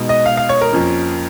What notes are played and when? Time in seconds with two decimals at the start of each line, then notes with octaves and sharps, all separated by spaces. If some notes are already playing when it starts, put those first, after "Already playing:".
Already playing: B2 G#3 D#4
0.09 D#5
0.26 F5
0.37 F5
0.49 C#5
0.61 A#4
0.73 F2 F3 A#3 C#4